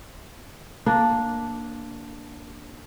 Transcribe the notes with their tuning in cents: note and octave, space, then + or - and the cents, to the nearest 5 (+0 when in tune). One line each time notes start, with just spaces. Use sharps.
A#3 +0 D4 +0